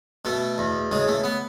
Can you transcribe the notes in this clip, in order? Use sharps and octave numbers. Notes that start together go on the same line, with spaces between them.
B2 A3
E2
C#3 G#3
A3
B3